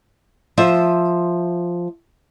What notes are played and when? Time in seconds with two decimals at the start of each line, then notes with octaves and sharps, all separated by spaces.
0.57 F3 C5 E5